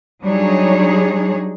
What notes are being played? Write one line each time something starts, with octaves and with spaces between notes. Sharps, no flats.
F#3 G3 D4 D#4 G#4 C#5